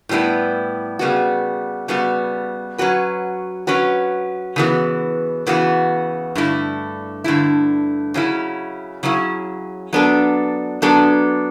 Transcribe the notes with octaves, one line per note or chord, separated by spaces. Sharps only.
A2 G3 B3 E4
C#3 G3 B3 F#4
C#3 G3 B3 F#4
F#3 C#4 F#4 B4
F#3 C#4 F#4 B4
C#3 E3 B3 F#4
C#3 E3 B3 F#4
G2 D3 A3 E4
G2 D3 A3 E4
C#3 F#3 C#4 E4
C#3 F#3 C#4 E4
F#3 B3 D4 A4
F#3 B3 D4 A4